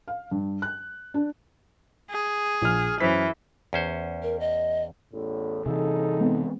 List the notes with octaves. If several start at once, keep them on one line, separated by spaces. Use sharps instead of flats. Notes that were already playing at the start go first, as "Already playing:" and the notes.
F5
G2
F#6
D4
G#4
A#1 F6
F#2 E3 C5 B6
E2 C#4 C5
A#4
D#5
A1 E2 A2
C3 E3 D#4 G#4 A4
G#3 B3 C4